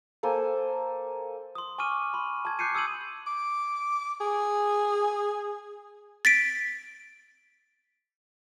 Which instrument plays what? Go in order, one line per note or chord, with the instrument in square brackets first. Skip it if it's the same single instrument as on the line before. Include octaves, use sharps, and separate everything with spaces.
[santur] A#3 A4 C5 G#5
[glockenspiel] C6 D#6
G#5 C#6 D6 F6 D#7
B5 C6
A5 G#6
D6 F#6 G6 C7 C#7 D#7
D#6 E6 G#6 D#7 F#7
[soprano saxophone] D6
G#4
[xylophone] A6 B6 D7